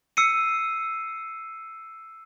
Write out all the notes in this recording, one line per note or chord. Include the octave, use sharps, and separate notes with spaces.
E6 C7 C#7 D#7